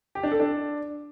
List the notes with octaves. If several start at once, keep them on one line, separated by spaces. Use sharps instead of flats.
G4
D4
A4
D4